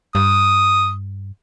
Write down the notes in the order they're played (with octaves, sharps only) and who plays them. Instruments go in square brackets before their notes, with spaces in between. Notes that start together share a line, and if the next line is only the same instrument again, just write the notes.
[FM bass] G2 [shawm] D#6